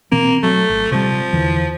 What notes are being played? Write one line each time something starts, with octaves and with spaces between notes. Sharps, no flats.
B2 E3 A#3 C4
F#3 A3
G#1
C3 F3 G3
E2 D3 E3